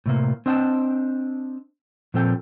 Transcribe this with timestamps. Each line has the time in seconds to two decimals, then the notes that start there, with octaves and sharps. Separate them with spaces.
0.06 A2 C3 A#3
0.46 C4 D4 D#5 G5 A5
2.14 A#2 F3 C4 A4 G5